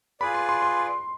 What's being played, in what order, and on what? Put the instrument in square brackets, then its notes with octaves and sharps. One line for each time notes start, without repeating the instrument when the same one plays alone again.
[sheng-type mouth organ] F4 G#4 B4 D5 [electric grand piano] B5
[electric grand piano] C6
C6
C6